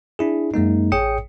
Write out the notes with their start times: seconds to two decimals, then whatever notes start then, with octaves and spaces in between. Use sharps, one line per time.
0.19 D4 E4 G#4
0.54 F#2 G#3 A#3 D#4
0.92 A1 G#4 C#5 G5 D#6 C#7